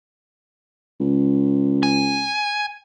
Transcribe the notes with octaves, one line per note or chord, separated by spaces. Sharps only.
C#2
G#5